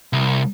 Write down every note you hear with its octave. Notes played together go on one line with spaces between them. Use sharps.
C2